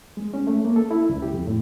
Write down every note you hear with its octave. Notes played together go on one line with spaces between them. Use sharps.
G#3
C#4
A3
A#3
A4
E4
C#2
G4
F2
A2